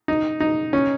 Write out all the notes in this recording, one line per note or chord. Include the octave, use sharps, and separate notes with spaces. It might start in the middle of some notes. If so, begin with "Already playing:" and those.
D#4
D#4
C#4